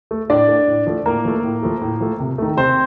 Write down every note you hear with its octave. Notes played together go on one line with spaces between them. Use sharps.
A3
A2 D4 D5
A3
A2
F3 A3
A2 A#3 A#4
F3 A3
A2
F3 A3
A2
F3 A3
C3
D#3 A3
C3 C4 C5